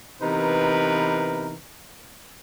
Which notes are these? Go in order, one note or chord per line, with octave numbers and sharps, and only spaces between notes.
C3 E3 B3 D#4 A#4 B4